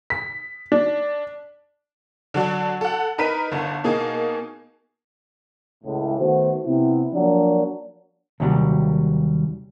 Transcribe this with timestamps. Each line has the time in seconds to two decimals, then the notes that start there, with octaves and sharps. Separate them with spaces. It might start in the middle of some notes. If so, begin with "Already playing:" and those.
0.10 B6
0.72 D4
2.34 D3 F#3 D4
2.81 A4 F#5
3.18 D#4 A#4 B4 B6 D#7
3.51 G1 D3
3.84 B2 A#3 D#4 G#4
5.84 C#2 A2
6.18 D#3 A3 B3 F#4 C5
6.65 C3 B3 E4
7.12 F3 F#3 A#3 D4 F#4 D5
8.40 D#2 C3 F#3 G3